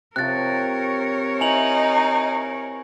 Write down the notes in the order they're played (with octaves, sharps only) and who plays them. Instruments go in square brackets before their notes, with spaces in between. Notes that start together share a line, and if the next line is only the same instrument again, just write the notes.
[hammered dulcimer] C3 F3 [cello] A#4 C#5 [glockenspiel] F#6 A6
[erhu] D#4 [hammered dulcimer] E4 [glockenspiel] G#5 F7 F#7